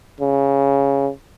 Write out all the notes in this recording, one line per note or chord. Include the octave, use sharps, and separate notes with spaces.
C#3